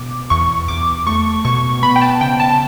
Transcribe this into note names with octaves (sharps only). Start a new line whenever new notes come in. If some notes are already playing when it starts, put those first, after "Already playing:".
Already playing: B2 D6
E2 C#6
E2 D6
A3 C#6
B2 C#6
B3 B5
G5
A5
C#3 G5
A5